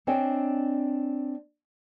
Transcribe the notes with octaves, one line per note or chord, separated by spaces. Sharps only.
C4 D4 C#5 D#5 G#5